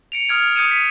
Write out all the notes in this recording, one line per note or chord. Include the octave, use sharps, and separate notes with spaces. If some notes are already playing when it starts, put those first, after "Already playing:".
C#7 D7 F7
D#6 F6 G#6 D7
D#6 G6 G#6 C#7 D#7 E7
B6 D#7